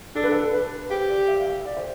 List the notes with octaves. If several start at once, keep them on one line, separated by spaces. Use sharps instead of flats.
D4 A4
B4
A4
B4
G4 C5
D5
E5
F5
E5
D5
C5